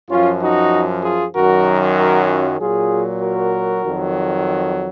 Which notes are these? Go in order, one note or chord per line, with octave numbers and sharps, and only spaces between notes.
F#2 F3 C#4 F4
D#4 F#4
F4 G#4
F#2 D#3 F#3 F#4 A#4
F#4 A#4
C#4 F4
A#2 F#3 F4 G#4
F#4 A#4
F2 D#3 F#3